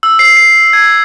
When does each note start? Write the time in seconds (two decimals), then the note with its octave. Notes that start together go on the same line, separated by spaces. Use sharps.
0.03 E6
0.19 C7
0.37 C7
0.73 G#6